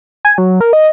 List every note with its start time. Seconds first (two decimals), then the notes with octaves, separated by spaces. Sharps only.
0.25 G#5
0.38 F#3
0.61 A#4
0.73 D#5